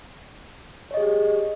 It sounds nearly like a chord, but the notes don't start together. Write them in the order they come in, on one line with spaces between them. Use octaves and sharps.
C#5 D#5 G#4 G4